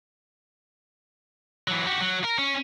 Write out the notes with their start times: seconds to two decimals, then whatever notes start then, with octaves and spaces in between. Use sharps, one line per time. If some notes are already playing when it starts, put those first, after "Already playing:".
1.68 E3 F#3
1.86 F#4 G4
2.01 F#3
2.24 A#4
2.38 C#4